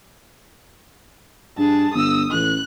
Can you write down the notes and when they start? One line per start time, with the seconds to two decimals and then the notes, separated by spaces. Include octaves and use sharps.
1.58 G2 G#4 A5
1.94 G1 D#6 E6
2.32 A1 F#6